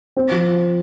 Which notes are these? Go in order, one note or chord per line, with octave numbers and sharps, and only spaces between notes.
C4
F3